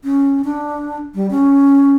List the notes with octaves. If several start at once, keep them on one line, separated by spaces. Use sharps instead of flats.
C#4
D4
G3
C#4